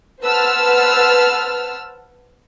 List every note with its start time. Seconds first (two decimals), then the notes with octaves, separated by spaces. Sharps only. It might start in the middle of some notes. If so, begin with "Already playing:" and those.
0.22 B4 C5 F#5 A5 E6 F6